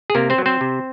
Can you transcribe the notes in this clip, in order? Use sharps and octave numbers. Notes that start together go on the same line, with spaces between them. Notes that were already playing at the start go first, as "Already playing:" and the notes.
G#4
C3 A#3 A#4
C4 C5
F#3
C4 C5
C3